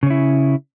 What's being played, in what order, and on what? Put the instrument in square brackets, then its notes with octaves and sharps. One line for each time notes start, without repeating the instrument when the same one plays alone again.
[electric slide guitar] C#3
C#4
E4